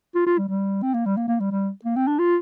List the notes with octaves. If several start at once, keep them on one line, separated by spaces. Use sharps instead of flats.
F4
F4
G3
G3
C4
A#3
G3
A#3
A#3
G3
G3
A#3
C4
D4
F4